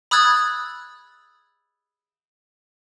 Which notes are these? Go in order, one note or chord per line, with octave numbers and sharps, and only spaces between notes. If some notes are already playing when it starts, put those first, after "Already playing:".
B5 D#6 E6 F#6 G#6 A6